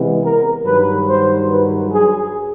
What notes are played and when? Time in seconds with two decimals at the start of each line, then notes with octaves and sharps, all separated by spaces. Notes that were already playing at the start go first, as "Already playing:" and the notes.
Already playing: C3 E3 G#3 B3
0.22 A#4
0.64 G2 D#3 F#3 B4
1.06 C5
1.47 B4
1.89 G#4